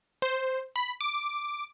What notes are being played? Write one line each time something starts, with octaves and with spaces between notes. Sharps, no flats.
C5
B5
D6